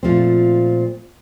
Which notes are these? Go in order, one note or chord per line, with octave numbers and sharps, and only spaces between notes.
A#2 F3 A3 C4